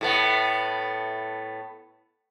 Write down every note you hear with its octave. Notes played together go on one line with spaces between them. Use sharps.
A2 A3 B3